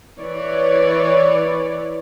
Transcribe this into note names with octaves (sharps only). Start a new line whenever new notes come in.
E3 C#5 D5